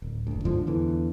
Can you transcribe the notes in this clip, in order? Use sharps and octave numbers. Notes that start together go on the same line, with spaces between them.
D1
F#1 D2
D#2 G#2 D3 F3
E2 D3 E3